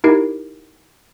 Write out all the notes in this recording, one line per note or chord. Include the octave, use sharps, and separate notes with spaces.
D#4 E4 G4 A#4 C7 D7